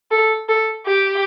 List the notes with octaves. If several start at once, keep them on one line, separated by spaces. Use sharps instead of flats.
A4
A4
G4